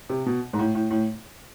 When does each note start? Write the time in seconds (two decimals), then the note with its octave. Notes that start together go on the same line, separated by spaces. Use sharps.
0.10 C3
0.26 B2
0.53 G#2
0.59 A2
0.75 A2
0.91 A2